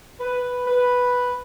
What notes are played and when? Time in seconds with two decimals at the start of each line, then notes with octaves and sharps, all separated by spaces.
0.20 B4
0.65 B4